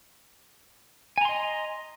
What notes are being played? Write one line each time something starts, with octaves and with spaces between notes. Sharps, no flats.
D#5 G#5 A#5 C6